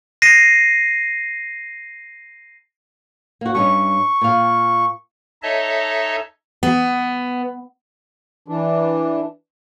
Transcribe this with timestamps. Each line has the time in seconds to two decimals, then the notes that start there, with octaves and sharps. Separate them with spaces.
0.22 A#6 C7 D#7
3.41 A#3 F#4
3.55 G2 C#4 D#4 C#6
4.21 A#2 F5
5.43 D#4 A4 C#5 D#5 E5 A5
6.63 B3
8.48 E3 D4